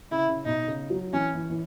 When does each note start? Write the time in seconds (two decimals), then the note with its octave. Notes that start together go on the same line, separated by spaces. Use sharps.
0.11 C#3 E4
0.28 C#3
0.45 B2 D#4
0.67 C#3
0.90 F#3
1.13 E3 C#4
1.35 E3
1.50 E3